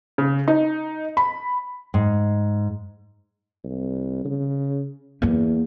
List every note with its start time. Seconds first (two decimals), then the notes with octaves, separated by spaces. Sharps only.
0.18 C#3
0.48 D#4
1.17 B5
1.94 G#2
3.64 C2
4.25 C#3
5.22 E2 A#3 B3